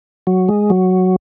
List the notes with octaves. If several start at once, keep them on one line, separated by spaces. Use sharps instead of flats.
F#3
G#3
F#3